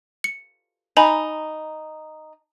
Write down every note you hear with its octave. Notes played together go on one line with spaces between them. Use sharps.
C#7
D#4 G#5 A#5 B5